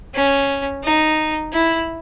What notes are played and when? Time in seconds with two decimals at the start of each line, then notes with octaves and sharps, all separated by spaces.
0.15 C#4
0.84 D#4
1.53 E4